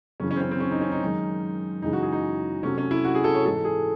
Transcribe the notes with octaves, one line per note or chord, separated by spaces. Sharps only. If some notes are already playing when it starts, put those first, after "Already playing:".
F#2 C#3 E3 C#4
C#4
C4
C#4
C4
C#4
D#4
C#4
D#4
F#2 D#3 G#3
F#2 C#3 E3 G#3 D#4
F#4
G#4
D#4
C3 F#3 A3 C#4
C#4
E4
F#4
G#4
A4
C#5
G#2 E3 G#3 A4
G#4